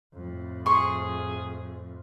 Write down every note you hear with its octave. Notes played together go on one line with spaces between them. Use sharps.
F2 A2
G#4 C6 C#6